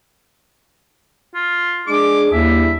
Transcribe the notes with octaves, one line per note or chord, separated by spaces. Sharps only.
F4
G#3 D4 G#4 D6
D#2 G3 D4 E4 E5